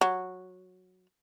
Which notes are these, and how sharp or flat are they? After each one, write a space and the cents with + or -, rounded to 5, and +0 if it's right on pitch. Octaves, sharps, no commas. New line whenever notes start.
F#3 -10